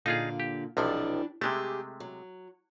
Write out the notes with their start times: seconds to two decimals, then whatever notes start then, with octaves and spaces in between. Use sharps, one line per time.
0.06 A#2 D3 D#4 F4 G#4 F5
0.40 G4
0.77 B1 C3 E3 F3 D4 G4
1.41 C3 G#3 A3 G4 G#4
2.00 F#3